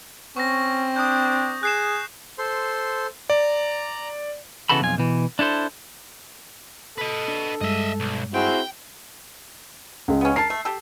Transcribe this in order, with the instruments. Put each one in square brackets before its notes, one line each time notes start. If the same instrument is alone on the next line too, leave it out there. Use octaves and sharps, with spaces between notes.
[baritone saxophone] C4 [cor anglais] C#4 [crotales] C#6 A#6
[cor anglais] D4 [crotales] D#6 G6
[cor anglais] G#4 [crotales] F#6 C7 E7
[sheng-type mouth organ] A4 C5 C6
[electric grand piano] D5 [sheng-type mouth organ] A#5
[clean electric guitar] C#3 E3 B3 F#4 A4 B5
B1 F2 F4 G#5
B2 E3
D4 E4 A4 C5
[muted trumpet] A4 [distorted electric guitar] B4 D#5
[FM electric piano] D4
[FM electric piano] G2 G3 G#3 [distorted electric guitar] D#5 E5
[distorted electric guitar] B1
[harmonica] C4 F#4 G#4 [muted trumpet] E4 [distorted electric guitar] G5
[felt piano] C#2 G#3
[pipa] B3 C#4
[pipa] A#4 A5 [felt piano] C7
[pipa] A3
G4 A4